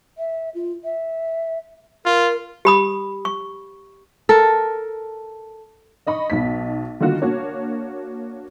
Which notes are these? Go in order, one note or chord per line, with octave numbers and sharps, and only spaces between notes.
E5
F4
E5
F4 A#4
G4 B5 D#6
C#6
A4 A#4
D#4 D#5 B5 C#6
B1 B2 D#4 B6
D3 D#3 A#3 F4 F#4
A#3 D4 F#4 C#5